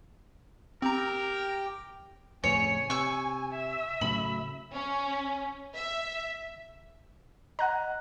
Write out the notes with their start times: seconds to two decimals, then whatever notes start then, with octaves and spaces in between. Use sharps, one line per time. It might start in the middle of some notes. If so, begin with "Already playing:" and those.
0.82 C4 G4 A#4 G5 A#5
2.44 F2 A2 C#3 C#5 G#5
2.90 C3 C#6 E6
3.52 E5
4.01 A2 C#3 F#3 B5
4.72 C#4
5.75 E5
7.59 D#5 F#5 A#5 F#6